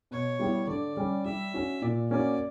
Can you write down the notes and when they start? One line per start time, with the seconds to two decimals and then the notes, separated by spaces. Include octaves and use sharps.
0.11 B2 C#5
0.39 G3 B3 E4 G4
0.67 D3 D5
0.97 G3 C#4
1.25 G3 E5
1.54 C#4 F#4
1.82 A#2 D5
2.10 A#3 C#4 F#4 D5